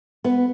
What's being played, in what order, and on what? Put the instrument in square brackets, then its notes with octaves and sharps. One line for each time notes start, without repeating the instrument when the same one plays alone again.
[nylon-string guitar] B3